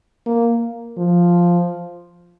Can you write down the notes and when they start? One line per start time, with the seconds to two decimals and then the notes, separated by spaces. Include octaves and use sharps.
0.26 A#3
0.97 F3